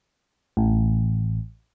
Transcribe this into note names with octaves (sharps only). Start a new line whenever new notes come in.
A1